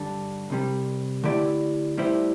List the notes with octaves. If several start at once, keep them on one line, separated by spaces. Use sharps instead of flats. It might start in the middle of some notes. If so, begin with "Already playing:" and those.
Already playing: G2 D3 G3 D4 A4
C2 C3 G3
D3 A3 E4 G4 D5
A2 G3 E4 C5